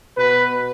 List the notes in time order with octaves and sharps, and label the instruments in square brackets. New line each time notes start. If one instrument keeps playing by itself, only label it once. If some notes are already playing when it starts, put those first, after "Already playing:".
[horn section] B2 B3 B4